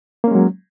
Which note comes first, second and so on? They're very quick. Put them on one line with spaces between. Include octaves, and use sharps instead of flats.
A#3 C#4 G#3 F#3